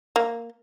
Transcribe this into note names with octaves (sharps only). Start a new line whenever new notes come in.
A#3